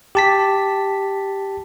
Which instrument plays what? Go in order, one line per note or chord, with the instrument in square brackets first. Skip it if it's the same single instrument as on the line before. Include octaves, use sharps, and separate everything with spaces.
[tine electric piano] G4 A5 B6